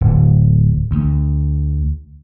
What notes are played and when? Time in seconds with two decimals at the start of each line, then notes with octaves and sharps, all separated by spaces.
0.01 D1
0.91 D2